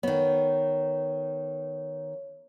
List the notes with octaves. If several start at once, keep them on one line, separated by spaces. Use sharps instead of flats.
D#3 B3 C#5